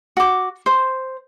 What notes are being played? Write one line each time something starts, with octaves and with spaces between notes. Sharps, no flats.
F#4 D6
C5